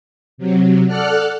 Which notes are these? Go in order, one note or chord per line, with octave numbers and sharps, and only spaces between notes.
C3 F#3
A4 D5 F#5 F6 F#6